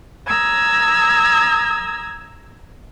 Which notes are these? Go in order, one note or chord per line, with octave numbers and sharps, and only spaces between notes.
A#5 D#6 E6 G#6